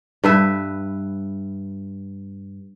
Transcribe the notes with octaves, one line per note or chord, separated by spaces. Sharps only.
G2 B4 E5